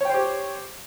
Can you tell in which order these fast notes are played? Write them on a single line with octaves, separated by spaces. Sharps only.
C#5 G5 C5 G4